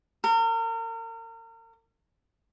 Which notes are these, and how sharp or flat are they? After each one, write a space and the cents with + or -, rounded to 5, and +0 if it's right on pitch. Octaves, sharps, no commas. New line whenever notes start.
A#4 -35